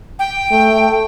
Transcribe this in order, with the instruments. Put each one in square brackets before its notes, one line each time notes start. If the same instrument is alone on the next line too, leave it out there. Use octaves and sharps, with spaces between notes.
[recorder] G5
[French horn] A3